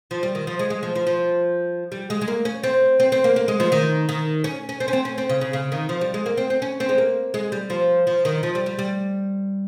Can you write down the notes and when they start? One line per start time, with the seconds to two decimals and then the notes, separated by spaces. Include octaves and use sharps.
0.11 F3
0.23 G3
0.35 D#3
0.47 F3
0.59 G#3
0.70 G#3
0.83 F3
0.95 F3
1.07 F3
1.92 G3
2.10 G#3
2.21 G#3
2.28 A#3
2.45 C#4
2.63 C4
3.00 C4
3.12 C4
3.24 A#3
3.36 A#3
3.48 G#3
3.60 F3
3.72 D#3
4.09 D#3
4.44 C#4
4.69 C#4
4.80 C4
4.88 C#4
4.93 C4
5.05 C#4
5.18 C4
5.29 C#3
5.41 C#3
5.53 C#3
5.72 D#3
5.89 F3
6.01 G3
6.14 G#3
6.26 A#3
6.37 C4
6.50 C4
6.62 C#4
6.80 C4
6.89 G#3
6.98 A#3
7.34 G#3
7.52 G3
7.70 F3
8.07 F3
8.25 D#3
8.43 F3
8.55 G3
8.66 G3
8.79 G3